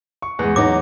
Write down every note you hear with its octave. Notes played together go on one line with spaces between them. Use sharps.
C#6
E2 G#3 B3
F#3 D#4 D6